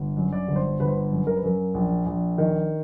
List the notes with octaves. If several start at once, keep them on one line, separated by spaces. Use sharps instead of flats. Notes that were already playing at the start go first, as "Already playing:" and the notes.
Already playing: G1
F#2
D5
G1
C5
G1 B4
C5
B4
F#2
A#4
B4
F#2 A#4
A#1
A#1
D#3